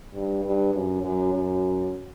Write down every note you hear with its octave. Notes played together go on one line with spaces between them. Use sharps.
G2
G2
F#2
F#2
F#2